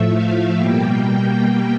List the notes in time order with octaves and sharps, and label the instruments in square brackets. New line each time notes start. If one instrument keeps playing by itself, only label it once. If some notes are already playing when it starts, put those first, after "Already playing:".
Already playing: [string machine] A2 F3 A3 E5
F5
B2 G3 A#3 G5